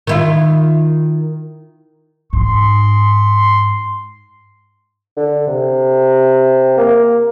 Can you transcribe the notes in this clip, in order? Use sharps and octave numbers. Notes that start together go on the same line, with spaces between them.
D#3 E4 F4
G#2 C6
D3
C3
A#3